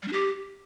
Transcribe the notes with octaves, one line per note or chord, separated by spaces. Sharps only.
G3
D4
G4